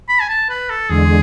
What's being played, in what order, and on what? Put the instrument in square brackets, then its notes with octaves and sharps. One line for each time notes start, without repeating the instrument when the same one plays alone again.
[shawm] B5
G#5
A5
B4
A4
[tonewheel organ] E2 D3 G#3 [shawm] G#4